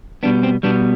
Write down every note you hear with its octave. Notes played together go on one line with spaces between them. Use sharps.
B2 G3 B3 D4
C4
B2 G3 B3 D4